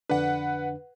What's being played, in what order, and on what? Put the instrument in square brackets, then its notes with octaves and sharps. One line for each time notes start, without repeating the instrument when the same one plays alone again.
[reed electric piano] F2 D3 D4 [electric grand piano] B4 F#5